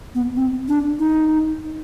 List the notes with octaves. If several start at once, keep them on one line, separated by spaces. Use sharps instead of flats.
B3
C4
D4
D#4